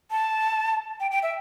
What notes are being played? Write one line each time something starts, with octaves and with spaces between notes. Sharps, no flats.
A5
G5
G5
E5